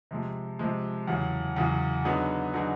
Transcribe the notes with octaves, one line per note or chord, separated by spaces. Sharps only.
C3 F3 G#3
C3 F3 G#3
E2 C#3 F#3
E2 C#3 F#3
D3 F#3 B3 D#4 G#4
D3 F#3 B3 D#4 G#4